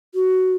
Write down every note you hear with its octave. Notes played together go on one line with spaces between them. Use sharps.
F#4